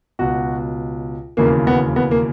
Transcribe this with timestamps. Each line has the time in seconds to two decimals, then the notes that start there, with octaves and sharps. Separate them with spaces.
0.19 C#2 B2 F#4
1.37 E1 D#2 C#3 E3 A#3
1.67 B3
1.96 B3
2.11 A#3